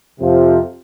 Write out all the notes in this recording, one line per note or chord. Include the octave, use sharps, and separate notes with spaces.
F2 C3 F3